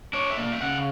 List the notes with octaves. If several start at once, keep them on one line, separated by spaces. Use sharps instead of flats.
D4 C#5
E5
A#3 D5
E5
C#3 F#5